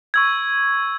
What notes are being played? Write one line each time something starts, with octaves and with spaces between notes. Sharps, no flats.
C#6 E6 G#6